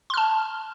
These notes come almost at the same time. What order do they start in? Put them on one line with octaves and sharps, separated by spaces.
C6 F6 A5